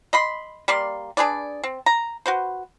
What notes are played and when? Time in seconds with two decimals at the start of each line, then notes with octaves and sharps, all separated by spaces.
0.13 D#5 B5 C6
0.68 G3 A#3 D5 C6
1.17 D4 G#4 B4 D5
1.64 C4
1.86 A#5
2.26 F#4 B4 C5